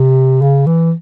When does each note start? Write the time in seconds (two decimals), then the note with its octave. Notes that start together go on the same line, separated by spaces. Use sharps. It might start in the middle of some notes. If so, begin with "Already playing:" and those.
Already playing: C3
0.42 C#3
0.67 E3